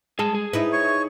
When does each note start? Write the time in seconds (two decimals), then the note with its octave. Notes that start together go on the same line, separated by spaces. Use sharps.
0.19 G#3 G#4 A5
0.35 G#4
0.53 D#4 E4 B4
0.73 C#5 C#6